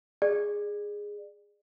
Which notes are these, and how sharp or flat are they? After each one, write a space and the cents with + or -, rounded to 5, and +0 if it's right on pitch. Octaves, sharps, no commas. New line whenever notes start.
G#4 -10 D5 +25